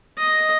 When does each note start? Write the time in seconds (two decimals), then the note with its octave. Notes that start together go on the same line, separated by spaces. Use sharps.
0.18 D#5